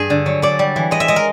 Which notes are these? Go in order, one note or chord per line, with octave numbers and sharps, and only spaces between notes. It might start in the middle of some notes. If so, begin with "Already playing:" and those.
Already playing: G2 G#4
D3
F#3
F#3 D5
G3
E3
G#3 D#5
E5
G#3 D#5
A#4